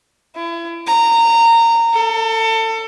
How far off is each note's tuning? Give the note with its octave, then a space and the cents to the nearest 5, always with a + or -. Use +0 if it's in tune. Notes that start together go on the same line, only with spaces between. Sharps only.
E4 +35
A#5 -20
A4 +30